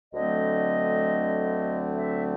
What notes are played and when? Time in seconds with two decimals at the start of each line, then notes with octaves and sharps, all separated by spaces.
0.12 D2 D3 F#3 A3 C4 D#5
1.95 E5